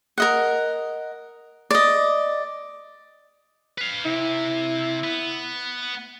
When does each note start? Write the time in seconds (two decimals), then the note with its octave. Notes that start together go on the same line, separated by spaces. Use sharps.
0.18 A#4 D#5 F#5
1.71 D5 D#5
3.78 B4 F5
4.05 C3 E4
5.04 B3